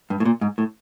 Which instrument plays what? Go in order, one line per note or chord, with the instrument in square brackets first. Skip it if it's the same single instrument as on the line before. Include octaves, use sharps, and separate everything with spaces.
[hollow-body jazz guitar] G2
A2
A#2
G#2
A2